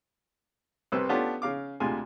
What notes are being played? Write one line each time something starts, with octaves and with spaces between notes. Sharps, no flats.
C2 C3 B4 C5 E6
A3 B3 C#4 D4 F4 G4
C#3 F5 D6
D2 C3 G#3 F4 G#5